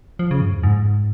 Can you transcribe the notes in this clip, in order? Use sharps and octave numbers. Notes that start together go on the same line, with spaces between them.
F3
C#3
G2
F2
G#2